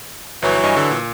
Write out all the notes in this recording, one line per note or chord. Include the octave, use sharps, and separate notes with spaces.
G1 E3 F#3
G2 D#5 G#5
D3
A#2